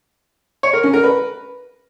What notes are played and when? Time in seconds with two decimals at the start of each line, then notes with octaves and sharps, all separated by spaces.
0.63 C#5
0.73 A#4
0.83 C#4
0.93 A#4
1.03 B4